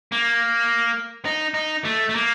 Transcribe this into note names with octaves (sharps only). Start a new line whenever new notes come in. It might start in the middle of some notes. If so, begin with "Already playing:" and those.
A#3
D#4
D#4
A3
A3
A#3